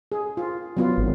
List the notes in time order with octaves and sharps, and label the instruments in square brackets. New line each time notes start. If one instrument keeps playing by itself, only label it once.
[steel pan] G#4
F4
F#3 B3 F4
[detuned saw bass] G#1